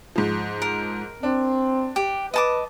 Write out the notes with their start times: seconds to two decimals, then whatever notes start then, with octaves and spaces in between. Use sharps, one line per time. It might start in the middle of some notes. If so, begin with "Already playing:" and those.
0.16 G#2 F3
0.62 A#4
1.23 C4 D4
1.96 G4
2.34 B4 D#5 A5 D6